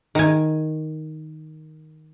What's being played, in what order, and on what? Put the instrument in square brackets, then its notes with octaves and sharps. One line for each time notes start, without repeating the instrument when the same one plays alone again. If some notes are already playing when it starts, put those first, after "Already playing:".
[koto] D#3 G#5